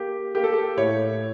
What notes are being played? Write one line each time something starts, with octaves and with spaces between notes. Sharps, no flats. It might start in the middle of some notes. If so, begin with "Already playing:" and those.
Already playing: A#3 G4
A#3 G4
A4
G4
A2 C#5